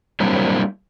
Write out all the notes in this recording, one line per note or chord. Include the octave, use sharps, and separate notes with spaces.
F#3 G3 A#3 C4 D4 E4